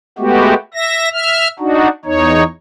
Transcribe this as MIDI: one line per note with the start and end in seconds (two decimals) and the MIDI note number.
0.19 0.54 56
0.19 0.54 57
0.19 0.54 59
0.19 0.54 66
0.19 0.54 67
0.74 1.09 76
0.74 1.09 94
1.14 1.48 76
1.14 1.48 89
1.59 1.88 62
1.59 1.88 63
1.59 1.88 66
2.05 2.43 40
2.05 2.43 63
2.05 2.43 73